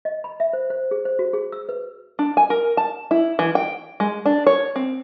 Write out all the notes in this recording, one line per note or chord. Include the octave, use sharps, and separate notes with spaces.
D#5
B5
E5
C5
C5
G#4
C5
F#4
G#4
E6
B4
D4
G#5
A#4
A5
E4
E3
G5
G#3
D4
C#5
C4